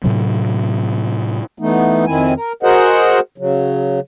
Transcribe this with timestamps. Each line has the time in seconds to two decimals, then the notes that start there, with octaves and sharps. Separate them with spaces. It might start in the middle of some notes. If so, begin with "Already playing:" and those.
0.04 A2 C3 F#3
1.59 E3 A3 B3 D#4
2.07 F2 D#3 C4 E4 G#5
2.36 A#4
2.63 F#4 G#4 A#4 C5 D#5 F#5
3.38 C#3 F#3